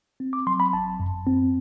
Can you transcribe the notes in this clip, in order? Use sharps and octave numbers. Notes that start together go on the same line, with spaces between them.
C4
D6
F#3 C6
B5
G1 A5
F#2
C4